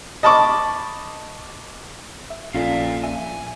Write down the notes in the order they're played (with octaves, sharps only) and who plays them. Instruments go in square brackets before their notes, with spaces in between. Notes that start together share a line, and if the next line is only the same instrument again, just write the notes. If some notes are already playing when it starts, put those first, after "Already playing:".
[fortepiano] D#5 A5 B5 C#6 D6
[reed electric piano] E5
[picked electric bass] A#1 [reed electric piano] C#4 F4 A4 [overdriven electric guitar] D5 F5
[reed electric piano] E5 [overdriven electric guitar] G#5